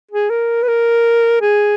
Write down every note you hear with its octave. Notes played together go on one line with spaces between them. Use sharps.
G#4
A#4
B4
A#4
G#4